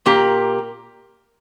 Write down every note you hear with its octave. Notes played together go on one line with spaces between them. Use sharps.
A#2 A#3 G4